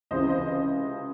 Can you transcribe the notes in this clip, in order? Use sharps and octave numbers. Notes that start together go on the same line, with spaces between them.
C#2 C3 E3 C5 D#5
C5 D#5
C5 D#5